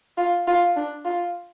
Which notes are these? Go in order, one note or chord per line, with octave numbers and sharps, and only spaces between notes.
F4
F4
D4
F4